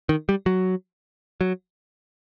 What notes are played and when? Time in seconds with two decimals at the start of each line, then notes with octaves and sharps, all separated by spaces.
0.09 D#3
0.29 G3
0.46 F#3
1.41 F#3